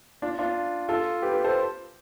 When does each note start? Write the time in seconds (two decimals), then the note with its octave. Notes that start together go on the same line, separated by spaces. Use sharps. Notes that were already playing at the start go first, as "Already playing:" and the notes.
0.22 D4 F4
0.39 D4 F4
0.89 F4 A4
1.22 G4 B4
1.33 G4 B4
1.44 A4 C5